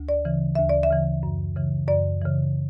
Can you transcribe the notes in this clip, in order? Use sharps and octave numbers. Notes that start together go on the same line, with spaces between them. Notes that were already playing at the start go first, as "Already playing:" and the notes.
Already playing: D2
D5
C#3 E3
D2 E5
D5
E5
C#3 E3
F#2
C#3 E3
F#2 D5
C#3 E3